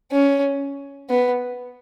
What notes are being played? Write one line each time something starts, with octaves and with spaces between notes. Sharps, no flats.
C#4
B3